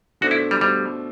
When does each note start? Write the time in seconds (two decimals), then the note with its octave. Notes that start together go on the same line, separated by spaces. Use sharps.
0.21 B2 A3 D4 F#4 A4 C5
0.31 E4
0.51 G3
0.61 B2 G3 A3 D4 A4 C5